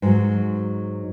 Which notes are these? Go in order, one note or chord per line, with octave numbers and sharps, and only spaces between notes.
G#2 F#3